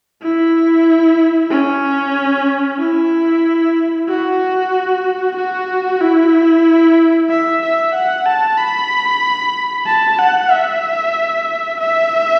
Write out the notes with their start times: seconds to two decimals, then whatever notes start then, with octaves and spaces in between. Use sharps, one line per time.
0.22 E4
1.50 C#4
2.79 E4
4.09 F#4
5.36 F#4
6.01 E4
7.30 E5
7.62 E5
7.94 F#5
8.26 A5
8.58 B5
9.86 A5
10.19 F#5
10.51 E5
11.80 E5